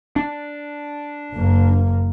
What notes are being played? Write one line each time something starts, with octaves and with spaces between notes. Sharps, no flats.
D4
F#1 A#3